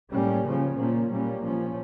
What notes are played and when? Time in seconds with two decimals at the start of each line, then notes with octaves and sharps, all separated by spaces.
0.11 A2 G3 A#3 C#4
0.44 C#3 F3 C#4
0.77 A#2 F3 A#3 C#4
1.10 A#2 G3 A#3 C#4
1.41 A#2 F3 C#4